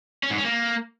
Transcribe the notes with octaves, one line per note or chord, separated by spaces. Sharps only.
C#4
G#2
C#4
A#3